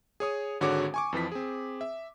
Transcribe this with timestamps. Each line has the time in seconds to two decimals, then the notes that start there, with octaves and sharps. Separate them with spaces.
0.20 G#4 C#5 D#6
0.61 G#1 D3 F#4 G#4 C#5 D6
0.94 G#5 C#6 D6
1.13 F2 E3 F3 B6
1.32 C4 G#4
1.81 E5